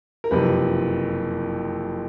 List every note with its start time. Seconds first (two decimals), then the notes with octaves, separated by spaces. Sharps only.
0.24 A#4
0.31 F#1 F2 C3 B4